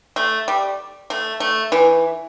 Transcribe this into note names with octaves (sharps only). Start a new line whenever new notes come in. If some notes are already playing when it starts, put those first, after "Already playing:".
A3
G3
A3
A3
E3